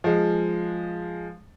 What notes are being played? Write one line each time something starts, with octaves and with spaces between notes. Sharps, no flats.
F3 G#3